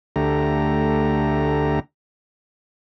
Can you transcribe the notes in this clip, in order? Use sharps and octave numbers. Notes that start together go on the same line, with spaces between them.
D2 D3 A3 G4 A#5